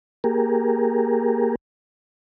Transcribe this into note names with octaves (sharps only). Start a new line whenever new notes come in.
A#3 G4 G#4 A#4